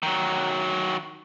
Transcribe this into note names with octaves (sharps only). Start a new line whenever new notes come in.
D#3 F#3